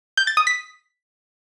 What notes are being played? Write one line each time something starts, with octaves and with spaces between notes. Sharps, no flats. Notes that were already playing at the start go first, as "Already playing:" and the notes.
G6
A6
D#6
B6